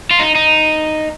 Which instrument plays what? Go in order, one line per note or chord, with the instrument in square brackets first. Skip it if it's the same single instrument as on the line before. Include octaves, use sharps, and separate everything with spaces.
[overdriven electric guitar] F4
D#4
D#4